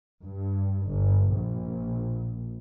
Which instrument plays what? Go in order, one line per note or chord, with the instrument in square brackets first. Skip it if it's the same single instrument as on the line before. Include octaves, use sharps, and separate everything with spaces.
[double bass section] G2
G1
A#1